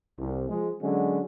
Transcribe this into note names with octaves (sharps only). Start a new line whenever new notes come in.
C2
F3 G#3
D3 F#3 G#3 C#4 F#4